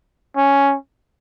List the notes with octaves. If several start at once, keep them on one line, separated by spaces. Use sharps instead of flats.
C#4